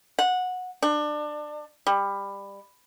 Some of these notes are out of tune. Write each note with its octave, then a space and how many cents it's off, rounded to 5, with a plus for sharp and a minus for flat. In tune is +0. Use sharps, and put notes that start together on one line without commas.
F#5 -15
D4 +25
G3 +20